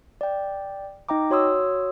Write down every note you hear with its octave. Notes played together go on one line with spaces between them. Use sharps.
D5 G5
D#4 D#5 G5 A#5 D6
F#4 C#5 C6 D#6 E6